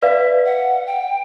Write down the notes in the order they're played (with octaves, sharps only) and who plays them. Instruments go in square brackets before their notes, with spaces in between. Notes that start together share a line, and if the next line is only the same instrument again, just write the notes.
[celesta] B4 D5 F5 [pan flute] E5
[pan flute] F#5
G5